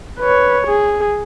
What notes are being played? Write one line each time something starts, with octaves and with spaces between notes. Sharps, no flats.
B4 C#5
G#4